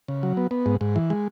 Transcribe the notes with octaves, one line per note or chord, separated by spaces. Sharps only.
C#3
F#3
B3
B3
G#2
G#2
E3
G#3